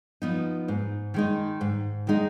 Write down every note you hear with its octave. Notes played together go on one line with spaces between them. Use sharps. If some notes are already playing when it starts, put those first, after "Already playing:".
F3 B3 D#4
G#2
D#3 G#3 D#4
G#2
D#3 G#3 D#4